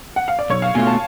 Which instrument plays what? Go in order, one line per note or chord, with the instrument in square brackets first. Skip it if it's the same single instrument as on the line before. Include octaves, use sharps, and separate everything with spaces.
[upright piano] F#5
F5
D5
[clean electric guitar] B1 [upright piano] C#5
[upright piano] F5
[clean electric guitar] B2 A3 F4 [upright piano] G#5
[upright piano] A5